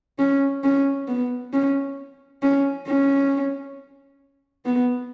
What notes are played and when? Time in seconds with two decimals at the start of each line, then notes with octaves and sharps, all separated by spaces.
0.19 C#4
0.64 C#4
1.08 B3
1.53 C#4
2.42 C#4
2.88 C#4
4.66 B3